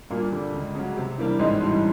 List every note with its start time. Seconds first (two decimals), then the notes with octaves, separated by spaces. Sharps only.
0.10 G2 A#2 A#3
0.32 D3 G3
0.54 C#2
0.75 C#3 F#3
0.97 C3
1.18 E3 G3 A#3 D4
1.39 A1 G#2 G#3
1.61 G2 E3 G3